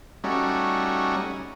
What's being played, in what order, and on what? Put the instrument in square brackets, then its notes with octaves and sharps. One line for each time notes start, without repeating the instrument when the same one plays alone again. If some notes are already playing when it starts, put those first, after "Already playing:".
[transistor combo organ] G3 A3 C#4 D#4 F#4